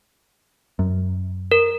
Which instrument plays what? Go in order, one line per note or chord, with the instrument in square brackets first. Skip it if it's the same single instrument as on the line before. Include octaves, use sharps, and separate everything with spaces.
[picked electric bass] F#2
[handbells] A#4